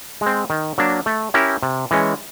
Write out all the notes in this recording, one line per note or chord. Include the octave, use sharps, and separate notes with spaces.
G#3
C4
D#3
F#3 A#3 D4
A3
C#4 E4 G4 A#4
C3
E3 G#3 C#4